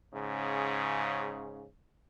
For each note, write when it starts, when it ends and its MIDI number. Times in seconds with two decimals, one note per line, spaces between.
0.14 1.65 44
0.14 1.65 49